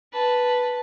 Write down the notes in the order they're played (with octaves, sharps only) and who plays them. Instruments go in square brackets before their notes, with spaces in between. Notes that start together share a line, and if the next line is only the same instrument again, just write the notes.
[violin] B4 A5